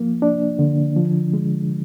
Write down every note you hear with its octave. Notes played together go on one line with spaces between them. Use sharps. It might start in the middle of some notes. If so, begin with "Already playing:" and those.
Already playing: F3 A#3
D4
D3
F3
G#3